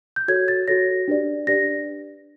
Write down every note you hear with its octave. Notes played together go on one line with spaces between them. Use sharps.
G6
F#4 A4 C#5 G#6
A6
F#4 A4 C#5 A#6
D4 G4 B4 D5
D4 G4 B4 D5 A#6